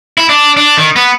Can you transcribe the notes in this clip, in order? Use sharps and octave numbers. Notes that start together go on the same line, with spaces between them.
E4
D4
D4
D#3
B3